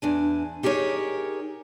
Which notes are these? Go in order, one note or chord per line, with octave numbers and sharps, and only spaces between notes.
E2 D4 G#5
D#4 G4 G#4 A#4 C#5